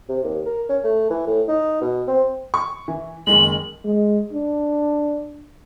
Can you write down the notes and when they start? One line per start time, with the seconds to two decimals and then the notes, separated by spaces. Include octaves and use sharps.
0.09 C3
0.24 D#2
0.46 A#4
0.69 C#4
0.84 A3
1.10 E3
1.27 A2
1.48 D#4
1.81 B2
2.08 C4
2.54 C#6
2.88 E3
3.27 F#1 D#3 G#3 F#7
3.84 G#3
4.33 D4